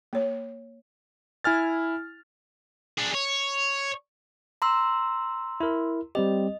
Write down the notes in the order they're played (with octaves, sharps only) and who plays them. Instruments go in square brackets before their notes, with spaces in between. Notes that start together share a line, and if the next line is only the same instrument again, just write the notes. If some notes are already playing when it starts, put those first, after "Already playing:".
[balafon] A#3 C#5
[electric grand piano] E4 G#5 F6 A6
[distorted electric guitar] D4 G#4
C#5
[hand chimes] A#5 C6 E6
[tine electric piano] E4 A#4
[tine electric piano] G3 C4 G4 [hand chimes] D#5